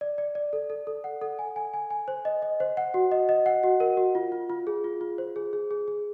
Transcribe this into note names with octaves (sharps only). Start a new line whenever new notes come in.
D5
D5
D5
A4
A4
A4
F#5
A4
G#5
G#5
G#5
G#5
C5
D#5
D#5
C5
F#5
F#4
D#5
D#5
F#5
F#4
A#4
F#4
F4
F4
F4
G#4
F4
F4
C5
G#4
G#4
G#4
G#4